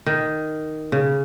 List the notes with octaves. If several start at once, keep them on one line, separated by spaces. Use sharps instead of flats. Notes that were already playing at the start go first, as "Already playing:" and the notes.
D#3
C#3